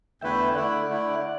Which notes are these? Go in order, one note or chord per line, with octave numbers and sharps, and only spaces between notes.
E2 D3 A3 E4 B4 E5 G5
E5
D3 A3 E4 D5 F#5
D3 A3 E4
D5 F#5